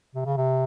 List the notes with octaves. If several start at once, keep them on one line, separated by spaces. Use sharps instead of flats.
C3
C#3
C3